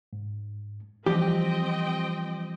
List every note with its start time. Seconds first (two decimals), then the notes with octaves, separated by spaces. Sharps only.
0.13 G#2
1.06 E3 F3 G3 C4 G4 D#5 G5